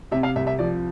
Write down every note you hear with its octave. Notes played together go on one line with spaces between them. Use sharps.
C3 E5
F5
C2 E5
E5
F3 D5